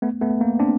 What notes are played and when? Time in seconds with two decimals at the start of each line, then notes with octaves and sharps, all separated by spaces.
0.02 A3 B3
0.21 A3 B3
0.41 A#3
0.59 C4 D4